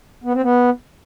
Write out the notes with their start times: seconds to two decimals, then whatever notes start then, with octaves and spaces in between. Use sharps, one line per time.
0.24 B3
0.33 C4
0.43 B3